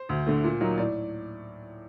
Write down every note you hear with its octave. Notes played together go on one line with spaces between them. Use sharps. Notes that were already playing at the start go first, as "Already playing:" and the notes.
Already playing: C5
D2
D3 A3
A#2
F#3 A#3 D#4
A2 D5